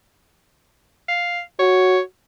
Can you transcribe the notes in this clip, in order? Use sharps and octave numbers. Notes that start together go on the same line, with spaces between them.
F5
F#4 C#5